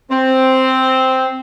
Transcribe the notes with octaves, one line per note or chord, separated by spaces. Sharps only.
C4